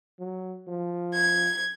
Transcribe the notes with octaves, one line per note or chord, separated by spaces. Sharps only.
F#3
F3
G#6